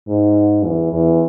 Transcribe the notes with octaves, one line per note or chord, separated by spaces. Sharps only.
G#2
E2
E2